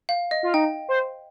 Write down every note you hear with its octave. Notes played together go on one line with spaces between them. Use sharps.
F5
D#5
F4
D#4 G5
C5